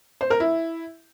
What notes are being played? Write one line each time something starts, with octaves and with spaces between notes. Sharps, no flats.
C5
A#4
E4